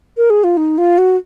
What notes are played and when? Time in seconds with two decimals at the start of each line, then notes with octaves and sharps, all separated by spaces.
0.17 A#4
0.30 G#4
0.44 F4
0.57 D#4
0.78 F4
0.98 F#4